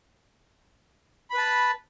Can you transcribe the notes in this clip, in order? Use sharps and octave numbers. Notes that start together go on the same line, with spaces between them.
B4 A5 B5